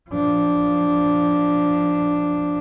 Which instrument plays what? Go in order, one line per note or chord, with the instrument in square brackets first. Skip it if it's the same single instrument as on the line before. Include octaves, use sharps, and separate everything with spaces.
[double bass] F3 D4